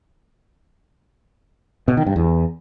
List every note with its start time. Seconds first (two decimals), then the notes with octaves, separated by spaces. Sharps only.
1.88 B2
1.97 D#3
2.07 G2
2.16 E2